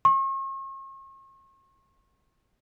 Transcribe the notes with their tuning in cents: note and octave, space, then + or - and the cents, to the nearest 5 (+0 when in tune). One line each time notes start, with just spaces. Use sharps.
C#6 -45